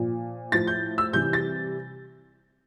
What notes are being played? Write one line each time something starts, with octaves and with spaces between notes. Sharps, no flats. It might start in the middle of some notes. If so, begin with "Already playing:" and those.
Already playing: A#2 F3
A2 F3 A6
G6
E6
C3 E3 G3 G6
A6